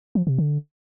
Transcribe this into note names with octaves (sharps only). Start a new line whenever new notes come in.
F3
C3
D3